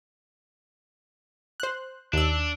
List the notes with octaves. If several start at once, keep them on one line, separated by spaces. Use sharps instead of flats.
C5 F#6
D#2 D4 E6